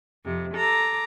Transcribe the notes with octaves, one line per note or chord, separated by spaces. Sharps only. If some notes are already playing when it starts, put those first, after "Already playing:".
F2 C3
A4 A#5 D6